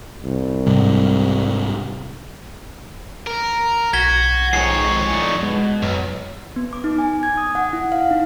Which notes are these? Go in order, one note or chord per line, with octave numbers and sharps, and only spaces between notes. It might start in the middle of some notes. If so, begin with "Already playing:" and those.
C2
G#2 C3 G3
A#4
B1 F#4 G#6 B6 G7
F2 G#2 D#3 G#4 C#5 C7
A2 D#4 D5
B2 G#3
B1 F#2
B3
D6
D#4
G#5
G#6
D#6
F#5
E4
F5
D#4